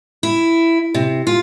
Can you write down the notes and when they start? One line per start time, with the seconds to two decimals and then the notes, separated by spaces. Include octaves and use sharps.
0.23 E4
0.94 C3
1.27 F4